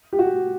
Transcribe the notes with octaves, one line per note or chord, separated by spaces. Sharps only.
G4
F#4